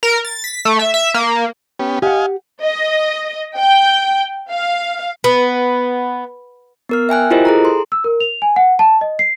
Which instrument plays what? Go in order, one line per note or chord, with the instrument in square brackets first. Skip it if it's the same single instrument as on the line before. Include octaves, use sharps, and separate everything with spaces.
[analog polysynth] A#4
A6
B6
A3
E5
E5
A#3
[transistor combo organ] B3 C#4 G4
[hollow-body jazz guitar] G4 F#5 [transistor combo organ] D#5 F5 G#5
[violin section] D#5
G5
F5
[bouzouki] B3
[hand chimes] B3 A#4 F6
E5 G5 G#5 F#6
E4 F4 G4 A#4 C5 D#5
G#4 A4 A#5
C6
[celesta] E6
A#4
F7
G#5
F#5
A5
D#5
C7